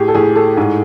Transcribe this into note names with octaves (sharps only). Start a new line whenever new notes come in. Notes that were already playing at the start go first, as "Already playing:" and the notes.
Already playing: A2 G4 G#4
A4
A2 G#4
A4
G#2 G#4